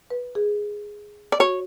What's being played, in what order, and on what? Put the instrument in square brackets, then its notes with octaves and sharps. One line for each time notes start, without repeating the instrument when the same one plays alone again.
[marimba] B4
G#4
[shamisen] D5
[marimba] F#4 [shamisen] C#5